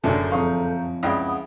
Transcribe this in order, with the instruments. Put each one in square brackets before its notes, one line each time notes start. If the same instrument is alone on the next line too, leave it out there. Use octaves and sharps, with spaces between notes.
[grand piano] F#1 F#2 D4 [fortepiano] A2 D3 [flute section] A4 A#5 G6
[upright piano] F#1 F2 F3 [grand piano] F5 C#6 D#6
[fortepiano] C#2 [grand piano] E4 G5 [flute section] F#5 B5 D#6